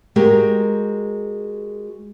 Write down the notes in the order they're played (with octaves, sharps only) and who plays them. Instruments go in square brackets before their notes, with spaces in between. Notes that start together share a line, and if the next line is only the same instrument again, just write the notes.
[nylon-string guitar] G#3 F#4 G4 A#4